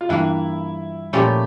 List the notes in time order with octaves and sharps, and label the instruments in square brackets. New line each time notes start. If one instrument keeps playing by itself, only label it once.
[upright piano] F4
[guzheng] G2 E3 A#3 [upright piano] E4
[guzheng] A#2 F3 A3 C#4 E4 [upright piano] G4